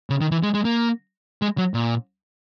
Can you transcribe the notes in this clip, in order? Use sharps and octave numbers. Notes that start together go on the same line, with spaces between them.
C#3
D#3
E3
G#3
G#3
A#3
G#3
F#3
A#2